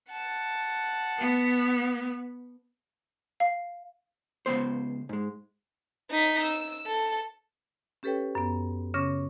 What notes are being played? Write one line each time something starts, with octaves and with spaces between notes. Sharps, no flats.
F#5 A5
B3
F5
C#2 G#2 B3 C5
G#2 G#3
D#4 B6
E6
A4
C#4 G4 A4 B4 C#5 G5
F#2 B3
C#3 C#4 C#5 C#6 D6 A#6